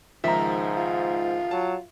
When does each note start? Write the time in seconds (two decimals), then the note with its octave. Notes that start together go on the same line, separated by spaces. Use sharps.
0.24 C#2 G#2 D#3 F3 E5 A#5
0.77 F4
1.51 F#3 A5